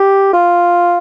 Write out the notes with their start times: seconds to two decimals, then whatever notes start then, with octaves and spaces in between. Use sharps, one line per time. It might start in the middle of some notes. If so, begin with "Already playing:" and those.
Already playing: G4
0.33 F4